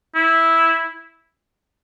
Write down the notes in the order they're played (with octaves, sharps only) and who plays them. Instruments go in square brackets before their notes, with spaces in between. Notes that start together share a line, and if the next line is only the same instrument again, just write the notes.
[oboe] E4